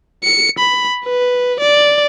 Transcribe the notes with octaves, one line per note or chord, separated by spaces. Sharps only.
C#7
B5
B4
D5